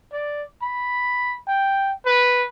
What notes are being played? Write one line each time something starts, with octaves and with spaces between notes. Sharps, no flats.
D5
B5
G5
B4